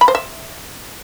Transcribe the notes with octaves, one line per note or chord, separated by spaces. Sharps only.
B5
C5
E5